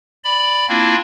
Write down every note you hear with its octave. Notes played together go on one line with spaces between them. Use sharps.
D5 B5
A#3 C4 D4 E4 F4